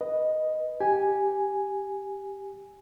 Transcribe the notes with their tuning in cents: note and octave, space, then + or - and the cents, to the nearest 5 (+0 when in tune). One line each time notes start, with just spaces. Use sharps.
B4 +0 D#5 +0
G4 +0 G#5 +0